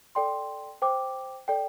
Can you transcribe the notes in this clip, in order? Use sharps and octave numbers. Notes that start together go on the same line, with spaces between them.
A4 D5 G5 C6
C5 G5 D6
A4 D5 G5